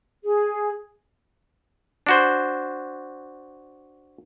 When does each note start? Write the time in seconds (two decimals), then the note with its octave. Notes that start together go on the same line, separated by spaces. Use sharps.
0.24 G#4
2.07 D4 F#4 C5